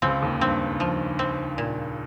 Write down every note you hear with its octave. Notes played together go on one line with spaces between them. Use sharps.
C#2 C#3 C4
D#2 D#3
G2 C4
F3
C4
A#2